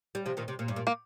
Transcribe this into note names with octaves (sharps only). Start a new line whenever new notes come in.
G3
C3 F3
A#2 D#3
C3
A#2
G2
A#2
A#3